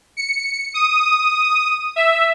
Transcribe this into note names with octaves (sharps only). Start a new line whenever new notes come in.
C#7
D#6
E5